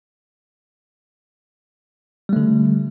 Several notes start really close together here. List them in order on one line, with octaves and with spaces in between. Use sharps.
G3 A3 D3